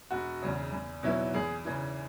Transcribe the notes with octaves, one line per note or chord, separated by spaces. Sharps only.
E1 F#4
E2 C#3
E2
B2 F#3 B3 E4
E2 G#4
C#3 E3